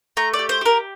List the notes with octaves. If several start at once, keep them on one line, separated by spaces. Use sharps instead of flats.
A3 A#5
D5
G4
C5
G4 A#4